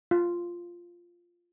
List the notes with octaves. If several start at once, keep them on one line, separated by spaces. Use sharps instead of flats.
F4